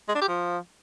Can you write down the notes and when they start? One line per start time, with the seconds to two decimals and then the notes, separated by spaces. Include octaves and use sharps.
0.08 G#3
0.15 D4
0.21 G4
0.28 F3